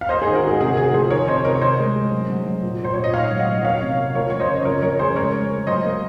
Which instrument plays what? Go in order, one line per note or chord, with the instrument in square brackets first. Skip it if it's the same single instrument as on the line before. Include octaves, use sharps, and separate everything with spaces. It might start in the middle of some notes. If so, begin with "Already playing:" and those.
[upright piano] F5
A#3 C5 D#5
D#3 G#4 C5
F#4 A#4
G#2 G#4
C3 G#4
F#4
C3 G#4
F3 G#4 C5
D#3 A#4 C#5
C3 C5 D#5
C3 A#4 C#5
C#5
C3 C5 D#5
G#3
G#3
F#3
F#3
F#3
A#2
A#2 C5
A#2 C#5
D#5
G#2 C#5 F5
F#3
D#5 F#5
F#3
A#3 C#5 F5
C3
A#3
F3 A#4 C#5
F3 C#5
C5 D#5
C#3
F2 A#4 C#5
F2 A#4 C#5
C#3 G#4 C5
G#3 A#4 C#5
G#3
G#3
F#3 C5 D#5
A#3